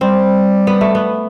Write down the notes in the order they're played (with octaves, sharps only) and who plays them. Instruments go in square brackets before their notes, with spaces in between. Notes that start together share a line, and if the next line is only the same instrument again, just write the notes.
[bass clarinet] G3 [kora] C4
[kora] B3
A3
B3